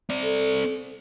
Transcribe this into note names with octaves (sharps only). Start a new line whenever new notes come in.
C4 D5
A4